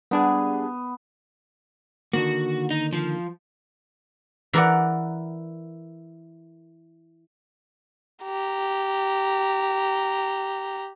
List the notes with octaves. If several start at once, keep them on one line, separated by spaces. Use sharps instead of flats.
G3 B3 D4 G#4
D3 D#3 A#3 F#4
D#4
F3
E3 A#4 D5 F#5
G4 A#5